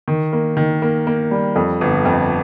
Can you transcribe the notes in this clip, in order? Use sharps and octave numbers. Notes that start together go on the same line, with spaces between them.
D#3
A#3
D#3
A#3
A#3
G3
F2
G1
F2